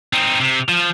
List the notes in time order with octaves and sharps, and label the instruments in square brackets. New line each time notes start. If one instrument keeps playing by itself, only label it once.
[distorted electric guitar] C4 D#4
C3
F3